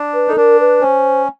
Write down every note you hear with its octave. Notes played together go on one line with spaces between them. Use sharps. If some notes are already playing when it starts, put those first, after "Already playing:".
Already playing: D4
B4
D#4 A4
D4 A#4
B4
C#4 C5